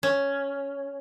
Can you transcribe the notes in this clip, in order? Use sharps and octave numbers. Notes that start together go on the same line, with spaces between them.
C#4